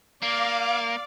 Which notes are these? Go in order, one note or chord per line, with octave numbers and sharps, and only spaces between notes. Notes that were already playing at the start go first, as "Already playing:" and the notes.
A#3 D5 F5 D6